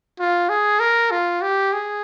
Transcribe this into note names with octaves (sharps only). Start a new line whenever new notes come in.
F4
G#4
A#4
F4
G4
G#4